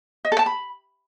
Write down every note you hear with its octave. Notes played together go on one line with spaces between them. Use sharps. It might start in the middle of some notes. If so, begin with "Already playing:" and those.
D#5
A4
A5
B5